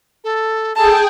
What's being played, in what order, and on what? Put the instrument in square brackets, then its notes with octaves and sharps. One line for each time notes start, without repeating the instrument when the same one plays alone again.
[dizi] A4
[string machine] G#4 G5 [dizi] A4 [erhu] A5